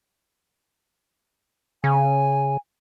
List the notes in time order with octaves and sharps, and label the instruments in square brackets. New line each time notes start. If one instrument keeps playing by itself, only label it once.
[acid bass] C#3 [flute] G#5